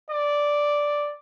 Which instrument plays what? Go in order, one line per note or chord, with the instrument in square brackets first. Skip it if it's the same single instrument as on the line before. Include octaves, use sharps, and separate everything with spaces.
[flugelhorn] D5